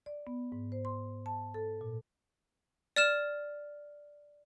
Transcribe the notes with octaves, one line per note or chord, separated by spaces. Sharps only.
D5
B3
G#2
C5
C6
A5
A4
A#2
D5 F6 E7